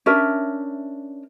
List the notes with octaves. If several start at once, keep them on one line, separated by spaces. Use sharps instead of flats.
C#4 D4 A#4 E5